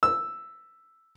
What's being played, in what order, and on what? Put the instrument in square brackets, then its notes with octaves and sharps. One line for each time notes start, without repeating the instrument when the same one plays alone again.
[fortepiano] E6